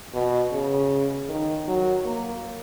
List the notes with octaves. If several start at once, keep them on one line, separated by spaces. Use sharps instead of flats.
B2
C#3
D#3
F#3
A#3